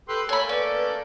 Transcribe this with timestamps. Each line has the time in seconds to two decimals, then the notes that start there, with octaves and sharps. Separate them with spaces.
0.09 G4 A4 B4 C6 E6
0.29 A3 A#3 A4 C#5 G#5 B5
0.49 C#4 B4 D5